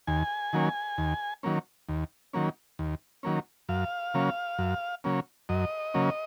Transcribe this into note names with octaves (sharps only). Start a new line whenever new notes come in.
D#2 G#5
D#3 F#3 A#3 C#4
D#2
D#3 F#3 A#3 C#4
D#2
D#3 F#3 A#3 C#4
D#2
D#3 F#3 A#3 C#4
F#2 F5
C#3 F#3 A#3 C#4
F#2
C#3 F#3 A#3 C#4
F#2 D#5
C#3 F#3 A#3 C#4